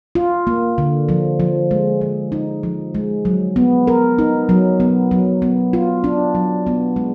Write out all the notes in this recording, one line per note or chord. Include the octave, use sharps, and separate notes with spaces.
F4
A#3
D3
F3
F3
G#3
F3
D#4
F3
G#3
F#3
B3
A#4
D#4
F#3
B3
F#3
B3
F4
D4
F#3
B3
G#3